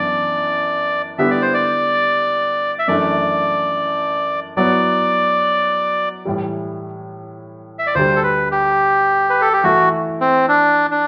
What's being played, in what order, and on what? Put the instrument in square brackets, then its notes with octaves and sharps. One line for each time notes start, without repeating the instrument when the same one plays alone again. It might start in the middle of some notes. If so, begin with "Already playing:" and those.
Already playing: [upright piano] F#2 E3 B3 D4 [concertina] D5
[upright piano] D3 G3 B3 E4 G4 [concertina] E5
[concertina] D5
C5
D5
E5
[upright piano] F#2 E3 A3 D4 [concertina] D5
[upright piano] F#3 B3 E4 [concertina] D5
[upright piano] A2 E3 G3
[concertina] E5
D5
[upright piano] D2 D3 G3 [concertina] C5
[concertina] A4
B4
G4
B4
A4
G4
[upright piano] E3 A3 E4 A4 [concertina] F#4
[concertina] C4
D4
D4